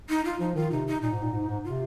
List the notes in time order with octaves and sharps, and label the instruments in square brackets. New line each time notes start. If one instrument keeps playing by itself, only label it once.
[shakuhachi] D#4
F4
[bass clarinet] F3 [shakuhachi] D#4
[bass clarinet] D#3 [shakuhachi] F4
[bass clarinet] C3 [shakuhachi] D#4
[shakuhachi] D#4
[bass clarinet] A#2 [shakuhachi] D#4
[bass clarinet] G#2
A#2
G#2
G#2
[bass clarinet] C3 [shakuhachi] F4